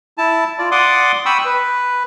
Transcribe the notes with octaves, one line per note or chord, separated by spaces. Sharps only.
E4 A5
F4 D5
D5 F#5 C6 D6 D#6
G5 B5 C#6 D#6 E6
B4